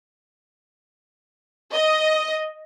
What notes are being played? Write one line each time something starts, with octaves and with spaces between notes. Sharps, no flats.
D#5